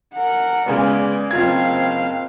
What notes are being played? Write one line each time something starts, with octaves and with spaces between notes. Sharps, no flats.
A#4 F#5
C#3 G#3 B3 D5 G#5
F#1 C4 F4 F5 G#6